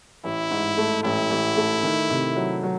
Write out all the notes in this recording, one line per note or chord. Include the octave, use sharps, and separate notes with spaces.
A1 E4
G#2
A3
A1 E4
A1
A3
D#3
C3
F#3
F#3